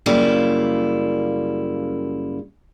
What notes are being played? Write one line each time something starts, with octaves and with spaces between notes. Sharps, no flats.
F#2 C#3 G3 A#3 E4 F4